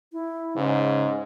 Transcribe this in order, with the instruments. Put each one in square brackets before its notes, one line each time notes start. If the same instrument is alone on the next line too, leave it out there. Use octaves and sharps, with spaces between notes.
[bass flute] E4
[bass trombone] G#2 [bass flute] C#3